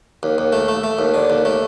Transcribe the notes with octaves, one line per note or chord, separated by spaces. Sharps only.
D#2
D#2
A3
A3
A3
D#2
D3
D#2
A3